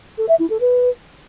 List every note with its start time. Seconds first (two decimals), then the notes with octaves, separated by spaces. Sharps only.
0.17 A4
0.28 E5
0.39 E4
0.49 A4
0.60 B4